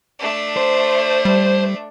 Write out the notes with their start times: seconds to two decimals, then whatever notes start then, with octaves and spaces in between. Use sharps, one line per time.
0.19 A3 D4
0.57 C5
1.25 G3